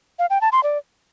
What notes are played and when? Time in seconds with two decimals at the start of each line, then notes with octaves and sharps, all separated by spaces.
0.19 F5
0.30 G5
0.41 A5
0.52 C6
0.63 D5